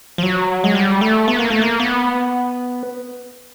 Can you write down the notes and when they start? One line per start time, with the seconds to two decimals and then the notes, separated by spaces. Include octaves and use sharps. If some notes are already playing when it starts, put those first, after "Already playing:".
0.18 F3
0.23 F#3
0.64 G#3
0.75 G3
1.01 A3
1.28 B3
1.39 A#3
1.50 A3
1.62 A#3
1.80 B3